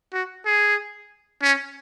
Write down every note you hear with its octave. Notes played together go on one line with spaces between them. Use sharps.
F#4
G#4
C#4